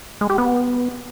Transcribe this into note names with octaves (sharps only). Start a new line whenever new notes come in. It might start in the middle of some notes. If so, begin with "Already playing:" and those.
G#3
G4
B3